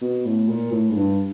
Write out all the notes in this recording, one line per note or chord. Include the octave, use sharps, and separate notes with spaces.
B2
A2
A#2
A2
G#2
G2